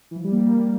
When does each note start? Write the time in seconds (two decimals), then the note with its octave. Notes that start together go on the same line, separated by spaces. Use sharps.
0.11 E3
0.16 F3
0.24 G3
0.32 A#3
0.40 G3